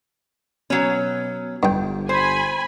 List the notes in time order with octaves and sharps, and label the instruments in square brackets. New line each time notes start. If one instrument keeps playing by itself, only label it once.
[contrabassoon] B2 [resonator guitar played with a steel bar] F#3 C#4
[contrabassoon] G1 [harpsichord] G2 G5
[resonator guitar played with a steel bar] C5 [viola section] G#5 B5